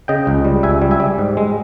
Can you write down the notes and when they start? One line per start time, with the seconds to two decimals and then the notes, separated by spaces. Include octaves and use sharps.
0.08 C#3 D#5 G5
0.27 C#2
0.45 G3
0.63 C#2 E5 G#5
0.82 G3
0.91 E5 G#5
1.00 G3
1.18 G#2
1.37 G#3